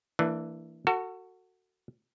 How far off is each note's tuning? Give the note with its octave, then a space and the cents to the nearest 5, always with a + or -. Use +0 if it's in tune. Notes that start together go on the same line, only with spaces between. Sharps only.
E3 +0 A#3 -30 D4 +10
F#4 +0 A4 +35